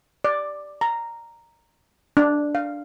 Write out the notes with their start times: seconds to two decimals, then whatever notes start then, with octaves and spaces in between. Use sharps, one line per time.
0.24 D5
0.81 A#5
2.17 D4
2.55 F5